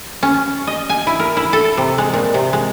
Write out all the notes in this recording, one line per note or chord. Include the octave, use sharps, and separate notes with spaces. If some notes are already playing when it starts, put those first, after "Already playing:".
C#4
D#5
G#5
E4
A#4
E4
A4
C3
G#3
A#2
C3
G#3